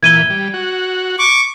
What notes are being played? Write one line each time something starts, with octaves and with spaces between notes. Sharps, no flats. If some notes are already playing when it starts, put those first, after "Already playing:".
A#2 E3 G#6 D#7 G7
G3
F#4
C#6 D6